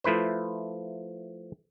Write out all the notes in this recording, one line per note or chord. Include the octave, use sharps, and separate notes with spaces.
F3 A3 E4 B4 C5